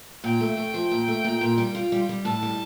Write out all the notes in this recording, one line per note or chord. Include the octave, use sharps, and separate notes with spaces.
A#2 G5
A3
A3
F3
A#2
A3
A#2
A#2
G3
F4
G3
G3
A2 A5
G3